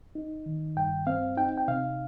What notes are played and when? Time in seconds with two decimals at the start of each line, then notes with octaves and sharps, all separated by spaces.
0.15 D#4
0.46 D#3
0.77 G2 G5
1.07 C4 F5
1.37 D#4 G5
1.58 G5
1.68 C3 F5